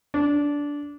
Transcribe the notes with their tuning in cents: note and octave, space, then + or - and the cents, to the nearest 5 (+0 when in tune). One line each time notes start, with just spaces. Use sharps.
D4 -15